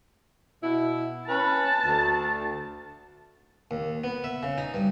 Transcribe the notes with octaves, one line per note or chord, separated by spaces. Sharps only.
B2 E4
C#4 B4 A5
D2
D#2
B3
E5
C#3
D#4
G2